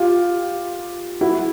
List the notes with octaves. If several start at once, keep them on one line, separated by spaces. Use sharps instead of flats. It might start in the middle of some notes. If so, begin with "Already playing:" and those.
Already playing: F4 G4
E4 F#4